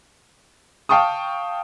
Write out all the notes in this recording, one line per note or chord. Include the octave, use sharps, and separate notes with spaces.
F5 G5 A5 C#6 D#6